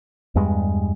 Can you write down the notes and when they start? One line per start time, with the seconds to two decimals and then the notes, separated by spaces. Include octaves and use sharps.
0.35 E2 G2 G3 G#3